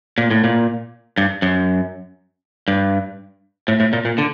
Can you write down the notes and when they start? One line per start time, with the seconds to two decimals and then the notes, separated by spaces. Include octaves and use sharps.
0.18 A#2
0.31 A2
0.44 A#2
1.18 G2
1.42 F#2
2.68 G2
3.68 A2
3.80 A2
3.93 A#2
4.05 A#2
4.18 D3